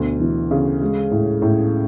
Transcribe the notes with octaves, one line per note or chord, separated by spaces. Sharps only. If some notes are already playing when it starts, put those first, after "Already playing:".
Already playing: D2 B2
E3
C#3
G#3
A2
A2